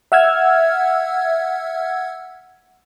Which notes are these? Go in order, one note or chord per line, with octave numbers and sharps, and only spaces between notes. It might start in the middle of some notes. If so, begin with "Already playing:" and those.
E5 F#5 E6 F6 G#6